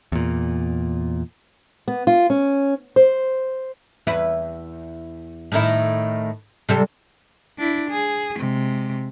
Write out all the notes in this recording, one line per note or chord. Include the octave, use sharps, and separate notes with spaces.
E2 A#2
B3
F4
C#4
C5
E2 E4 B4
A2 D#3 E4
C3 G3 A4
D4 E4
G#4
C3 G#3